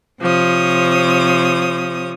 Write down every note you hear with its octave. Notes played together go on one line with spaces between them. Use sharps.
C3 F3 C#5 D#6